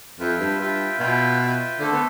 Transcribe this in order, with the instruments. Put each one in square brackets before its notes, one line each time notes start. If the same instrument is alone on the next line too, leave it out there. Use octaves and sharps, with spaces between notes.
[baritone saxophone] F2 [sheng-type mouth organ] F4 B4 E5 G5
[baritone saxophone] G2
[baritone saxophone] G2 [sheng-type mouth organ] F4 B4 E5 G5
[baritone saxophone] B2 [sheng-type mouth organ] F4 B4 E5 G5
[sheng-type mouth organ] F4 B4 E5 G5
[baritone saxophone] D3 [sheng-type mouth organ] A3 D4 A4 C5 E5
[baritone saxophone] B3